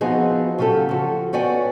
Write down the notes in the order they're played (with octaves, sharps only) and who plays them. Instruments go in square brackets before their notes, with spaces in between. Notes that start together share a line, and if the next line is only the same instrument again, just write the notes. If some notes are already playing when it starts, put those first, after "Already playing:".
[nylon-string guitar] F3 B3 C4 D#4 F#4 G#4
C#3 F#3 F4 G4 A4
F3 F#4
B3 F#4 C#5 D5 G5 G#5